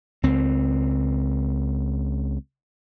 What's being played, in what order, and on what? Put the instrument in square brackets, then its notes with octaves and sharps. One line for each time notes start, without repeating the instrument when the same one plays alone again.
[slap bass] C#2 C4